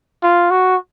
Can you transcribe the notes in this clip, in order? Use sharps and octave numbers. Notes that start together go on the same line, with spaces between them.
F4
F#4